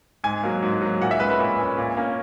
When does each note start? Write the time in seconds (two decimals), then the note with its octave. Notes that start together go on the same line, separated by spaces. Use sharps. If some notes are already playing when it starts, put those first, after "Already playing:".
0.24 G#2 G#5
0.43 F#3 A#3
0.63 G#2
0.82 F#3 A#3
1.01 A#2 F#5
1.11 E5
1.20 G#3 B4
1.23 C#4
1.30 B4
1.39 A#2
1.58 G#3 C#4
1.78 A#2
1.97 A#3 C#4